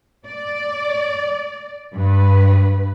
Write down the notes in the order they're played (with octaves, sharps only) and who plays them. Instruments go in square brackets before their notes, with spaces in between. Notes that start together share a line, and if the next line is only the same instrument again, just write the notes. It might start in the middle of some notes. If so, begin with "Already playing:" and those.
[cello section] D5
G2 B4